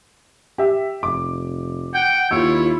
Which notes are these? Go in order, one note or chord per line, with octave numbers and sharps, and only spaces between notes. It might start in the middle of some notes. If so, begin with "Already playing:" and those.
G4 E5
F1 D6
F#5 G5
D#2 E4 F4 C#5 E6